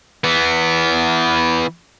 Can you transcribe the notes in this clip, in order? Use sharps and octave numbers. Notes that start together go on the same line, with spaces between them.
E3 B3